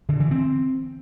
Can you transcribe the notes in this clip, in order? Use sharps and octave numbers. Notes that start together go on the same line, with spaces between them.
D3
E3
C4